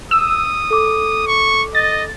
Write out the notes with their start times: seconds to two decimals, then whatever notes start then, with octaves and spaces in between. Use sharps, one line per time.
0.11 D#6 E6
0.71 A4 D6
1.27 C#6
1.75 D#5 A6